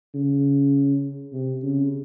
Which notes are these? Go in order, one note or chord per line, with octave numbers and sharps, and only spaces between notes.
C#3
C3
C#3